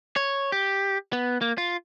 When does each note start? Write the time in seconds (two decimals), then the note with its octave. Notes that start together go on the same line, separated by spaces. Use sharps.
0.16 C#5
0.52 G4
1.13 B3
1.41 A#3
1.58 F4